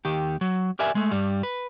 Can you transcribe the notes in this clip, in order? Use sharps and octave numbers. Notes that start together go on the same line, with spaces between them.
D#2 D#3 G4
F#3
G4 A#4 D5 E5 G#5
G#3 A3
G2 G3
B4